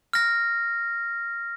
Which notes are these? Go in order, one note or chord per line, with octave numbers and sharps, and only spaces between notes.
F6 A#6